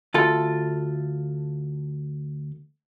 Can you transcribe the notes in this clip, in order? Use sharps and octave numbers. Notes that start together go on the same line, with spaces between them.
D2 F4 A4